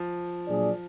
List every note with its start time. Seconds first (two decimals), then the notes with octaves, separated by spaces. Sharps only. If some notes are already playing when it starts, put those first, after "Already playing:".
Already playing: F3
0.47 A#2 F#3 D4 G#4 D5